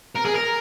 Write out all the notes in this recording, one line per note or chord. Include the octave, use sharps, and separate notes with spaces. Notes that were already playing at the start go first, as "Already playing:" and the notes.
A#4
G#4
A#4